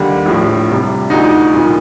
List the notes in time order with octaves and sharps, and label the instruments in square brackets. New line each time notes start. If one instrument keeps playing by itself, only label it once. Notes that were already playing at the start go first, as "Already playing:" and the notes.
Already playing: [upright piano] D#2 D3 G3
A#1 A2 F3
C2 C3 G3
D2 D3 F3 D#4
C2 A#2 F3